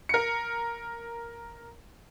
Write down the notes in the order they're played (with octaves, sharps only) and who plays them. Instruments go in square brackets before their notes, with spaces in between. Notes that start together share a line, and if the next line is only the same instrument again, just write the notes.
[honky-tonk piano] A#4 C#7